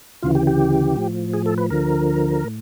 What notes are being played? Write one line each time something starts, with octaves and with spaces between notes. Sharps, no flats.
D2 C#3 E3 F4
G4
G4
A2 F3
G#4
A4
B4
D2 D3 F3 A#4
A2